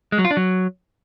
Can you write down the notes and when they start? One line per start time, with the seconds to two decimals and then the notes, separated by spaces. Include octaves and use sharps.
0.12 G#3
0.18 F#3
0.25 F4
0.31 D4
0.37 F#3